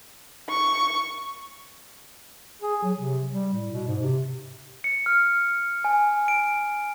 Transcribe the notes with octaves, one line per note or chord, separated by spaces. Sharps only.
C#6
G#4
F#3
C3
G3
A2
B2
G#2
C3
C#7
F6
G#5
D7